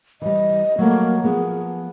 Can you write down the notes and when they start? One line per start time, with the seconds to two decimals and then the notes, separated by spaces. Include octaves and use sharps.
0.22 E3 G3 D#5
0.78 F#3 G3 A3 A#3
1.24 F3 B3 G#4